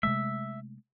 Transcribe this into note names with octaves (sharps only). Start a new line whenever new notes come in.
C3 G#3 A3 E5